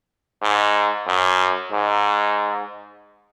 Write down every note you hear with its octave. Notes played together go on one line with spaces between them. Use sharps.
G#2
F#2
G#2